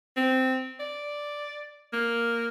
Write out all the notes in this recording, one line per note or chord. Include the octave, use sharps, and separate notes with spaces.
C4
D5
A#3